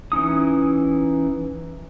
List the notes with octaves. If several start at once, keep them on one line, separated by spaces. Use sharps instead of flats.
E3 C#4 D#4 D#6